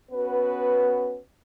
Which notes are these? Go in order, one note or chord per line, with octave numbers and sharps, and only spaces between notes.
B3 C#4 F#4 B4